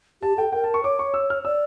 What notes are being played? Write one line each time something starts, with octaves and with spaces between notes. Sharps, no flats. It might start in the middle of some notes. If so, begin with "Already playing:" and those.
G4 A5
A4 G5
A#4 G5
A5
C#6
C#5 D6
C#6
E6
F6
D5 E6